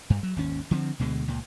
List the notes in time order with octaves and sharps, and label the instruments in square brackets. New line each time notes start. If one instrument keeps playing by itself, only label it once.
[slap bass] G2
F#3
G#1 D#2 C#4
D3 F3 A#3 C4
D2 B2 D3 G#3
C#2 A#2